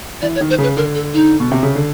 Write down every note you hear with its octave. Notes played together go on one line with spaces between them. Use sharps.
E3 D5
C#5
D#3
C5
C#3 B4
D3 A#4
A4
D#4
B2
C3
C#3
D3